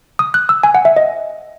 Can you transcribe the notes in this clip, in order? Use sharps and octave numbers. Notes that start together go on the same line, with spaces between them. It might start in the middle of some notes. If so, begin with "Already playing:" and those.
D#6
F#6
E6
G#5
F#5
E5
D#5